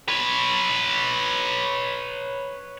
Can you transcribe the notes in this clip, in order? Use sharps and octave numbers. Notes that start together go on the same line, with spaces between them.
B4 C#5